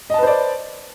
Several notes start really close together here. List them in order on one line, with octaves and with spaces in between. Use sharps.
D#5 A5 B4 C5 D5